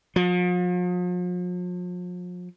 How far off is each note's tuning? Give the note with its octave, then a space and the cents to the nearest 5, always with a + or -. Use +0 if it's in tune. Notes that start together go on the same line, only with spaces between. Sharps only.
F3 +40